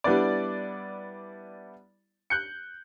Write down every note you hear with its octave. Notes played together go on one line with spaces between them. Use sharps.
G3 B3 D4 E4 D5
F#6 G6 C#7